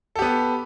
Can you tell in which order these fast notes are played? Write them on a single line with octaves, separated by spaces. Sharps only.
A4 G4 B3